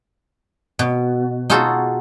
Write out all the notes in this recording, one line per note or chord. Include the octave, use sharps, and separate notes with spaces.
B2
D#4 F4 F#4 G#4 A4 A5